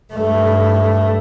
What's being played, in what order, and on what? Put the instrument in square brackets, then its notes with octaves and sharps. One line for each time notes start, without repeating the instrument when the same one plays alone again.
[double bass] G2 A3